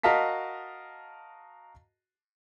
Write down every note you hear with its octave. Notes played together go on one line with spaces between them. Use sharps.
F#4 A#4 D#5 F5 A5 B6